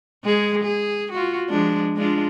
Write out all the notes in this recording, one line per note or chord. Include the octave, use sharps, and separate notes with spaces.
G#3 G#4
G#4
F4 F#4
F3 G#3 D4
G#3 D4 F4